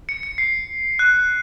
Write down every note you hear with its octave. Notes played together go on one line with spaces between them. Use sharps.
C#7
C#7
C7
F#6